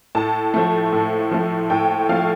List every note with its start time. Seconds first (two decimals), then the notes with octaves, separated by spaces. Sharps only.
0.15 A2 A5
0.54 F3 A3
0.92 A2
1.31 F3 A3
1.70 A2 G5
2.09 F3 A3 F5